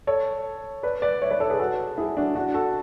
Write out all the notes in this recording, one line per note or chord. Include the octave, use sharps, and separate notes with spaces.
A4 C#5
B4 D5
B4 D5
C#5 E5
B4 D5
A4 C#5
G#4 B4
F#4 A4
E4 G#4
D4 F#4
D4 F#4
F#4 A4